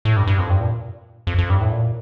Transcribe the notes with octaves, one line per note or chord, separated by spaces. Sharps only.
A2
G2
G2
F2
G2
A#2
F2
F2
G2
A2
A#2